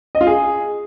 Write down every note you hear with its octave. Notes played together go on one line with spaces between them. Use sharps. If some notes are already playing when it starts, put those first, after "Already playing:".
D#5
F4
G#4